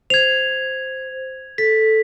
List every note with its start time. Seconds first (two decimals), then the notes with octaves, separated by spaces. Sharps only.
0.10 C5 G#6 F7
1.58 A4 B6